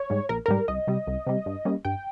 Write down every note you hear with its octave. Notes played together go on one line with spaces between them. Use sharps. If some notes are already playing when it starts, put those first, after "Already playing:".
Already playing: C#5
G#2 G3
A#1 A#4
G#2 G3 A#4
C2 D#5
C3 G3
C2
C3 G3
G2
G3 A#3 C#4
G2 G5